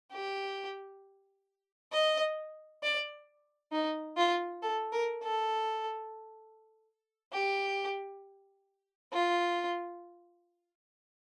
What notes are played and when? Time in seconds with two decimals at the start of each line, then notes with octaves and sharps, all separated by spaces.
0.12 G4
1.93 D#5
2.83 D5
3.72 D#4
4.17 F4
4.63 A4
4.92 A#4
5.23 A4
7.33 G4
9.13 F4